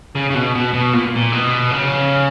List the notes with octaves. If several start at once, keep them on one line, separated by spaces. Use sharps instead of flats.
C#3
C#3
B2
B2
B2
A#2
A#2
B2
C#3